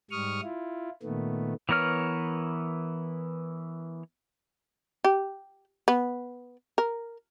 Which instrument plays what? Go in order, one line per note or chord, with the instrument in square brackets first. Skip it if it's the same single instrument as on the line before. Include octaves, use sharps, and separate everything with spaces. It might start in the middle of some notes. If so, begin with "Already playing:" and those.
[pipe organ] G#2 G3 C#6 D#6 F6
E4 F4
A#2 D#3 A3 B3
[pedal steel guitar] E3 B3 A#4 C#5 F6
[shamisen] G4
B3
A#4